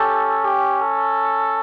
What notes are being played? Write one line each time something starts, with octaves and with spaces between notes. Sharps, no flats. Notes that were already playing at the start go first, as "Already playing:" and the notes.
Already playing: C#4 G4 A4
G4
A4